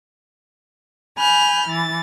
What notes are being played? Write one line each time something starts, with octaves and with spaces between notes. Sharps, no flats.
G#5 B5 F6 G6
E3 A6